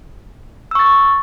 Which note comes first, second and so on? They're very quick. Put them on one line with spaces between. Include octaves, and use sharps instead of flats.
E6 C#6 A6